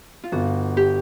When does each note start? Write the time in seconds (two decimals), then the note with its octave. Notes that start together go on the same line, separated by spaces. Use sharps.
0.24 F4
0.32 G1 F#4
0.77 G4